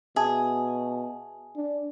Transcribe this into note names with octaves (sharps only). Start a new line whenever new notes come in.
B2 G#4 E5 G#5 A5
D4